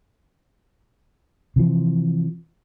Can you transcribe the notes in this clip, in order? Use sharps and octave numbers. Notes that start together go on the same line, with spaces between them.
C3 E3 F3